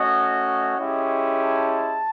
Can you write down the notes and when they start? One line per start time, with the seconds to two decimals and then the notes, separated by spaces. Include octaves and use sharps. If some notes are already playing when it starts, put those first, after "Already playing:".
Already playing: A3 C#4 F#4 D#5
0.77 G#3 C#4 E4 G4
1.39 A5